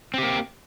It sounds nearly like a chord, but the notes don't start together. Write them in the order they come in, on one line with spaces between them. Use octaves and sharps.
C4 G4 A#3